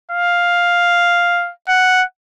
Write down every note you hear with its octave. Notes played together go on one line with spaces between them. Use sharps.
F5
F#5